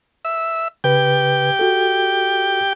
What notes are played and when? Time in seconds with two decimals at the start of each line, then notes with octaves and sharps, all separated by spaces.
0.25 E5
0.84 C#3 G4 B4 G5
1.59 F#4 A4